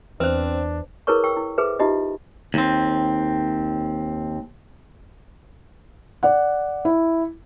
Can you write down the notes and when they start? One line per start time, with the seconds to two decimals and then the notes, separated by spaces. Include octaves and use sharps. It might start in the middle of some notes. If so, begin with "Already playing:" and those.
0.20 E2 C4 D4 B4 C5
1.07 E4 G#4 A#4 B4 C#5 C#6
1.24 G5 C#6 E6
1.37 E4
1.58 G#4 A4 B4 C5 E5
1.79 D#4 F4 G4 D#5 E5
2.54 D#2 C4
6.23 D5 F#5
6.85 E4